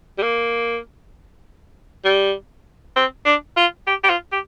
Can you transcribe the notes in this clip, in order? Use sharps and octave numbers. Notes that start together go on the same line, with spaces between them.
G3
A#3
G3
C4
D4
F4
G4
G4
F4
G4